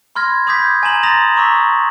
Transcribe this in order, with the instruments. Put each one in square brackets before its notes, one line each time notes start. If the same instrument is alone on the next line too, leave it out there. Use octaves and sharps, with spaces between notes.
[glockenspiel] B5 C6 F6 G#6 A#6
B5 D6 D#6 G6 G#6 B6
G#5 A#5 E7 F#7
A#5 C6 D#6 A6 A#6 F7
A#5 C#6 D#6 E6 B6